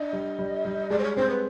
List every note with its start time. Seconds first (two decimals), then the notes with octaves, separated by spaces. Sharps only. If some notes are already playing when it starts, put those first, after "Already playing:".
Already playing: D4 D#5
0.13 G3
0.39 G3
0.65 G3
0.90 G#3 D5
0.99 C5
1.04 C#5
1.17 C4 C5
1.29 B4